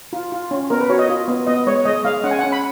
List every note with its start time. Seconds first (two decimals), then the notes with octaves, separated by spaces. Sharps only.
0.13 F4
0.32 F4
0.51 C#4
0.70 B3 A#4
0.80 B4
0.90 F#4 C#5
0.99 D#5
1.08 F4
1.28 B3
1.47 B3 D#5
1.67 G#3 C#5
1.85 G#3 D#5
2.05 G#3 F5
2.24 C#4 F#5
2.31 G#5
2.39 F#5
2.43 C#4
2.52 B5